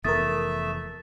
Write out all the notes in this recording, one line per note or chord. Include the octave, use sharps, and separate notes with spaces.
F1 E3 A3 B3 A#4 E5 D#6 A6